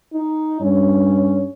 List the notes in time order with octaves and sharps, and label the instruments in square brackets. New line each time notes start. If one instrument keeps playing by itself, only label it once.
[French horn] D#4
[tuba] G2 [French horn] C#4